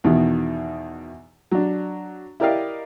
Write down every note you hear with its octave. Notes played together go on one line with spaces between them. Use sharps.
E2 B2 D#3
F#3 D4
E4 G4 A#4 D5 D#5 F5